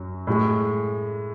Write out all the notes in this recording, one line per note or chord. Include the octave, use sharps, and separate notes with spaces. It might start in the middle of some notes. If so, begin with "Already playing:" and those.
Already playing: F#2 F#3
A2 G#3